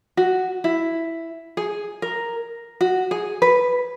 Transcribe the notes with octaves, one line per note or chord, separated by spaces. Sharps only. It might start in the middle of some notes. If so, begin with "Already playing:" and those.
F#4
E4
G#4
A#4
F#4
G#4
B4